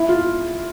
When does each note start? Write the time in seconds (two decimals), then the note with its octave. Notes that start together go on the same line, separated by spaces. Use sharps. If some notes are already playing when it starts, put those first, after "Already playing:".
Already playing: E4
0.09 F4